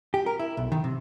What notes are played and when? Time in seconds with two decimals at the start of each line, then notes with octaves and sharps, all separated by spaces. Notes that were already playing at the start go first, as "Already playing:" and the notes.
0.14 G4
0.26 A#4
0.39 E4
0.57 B1
0.72 D#3
0.84 C3